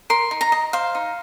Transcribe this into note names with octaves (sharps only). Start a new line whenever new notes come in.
A#4 C6
D#4
A#5
D#5
C5 F5
D#4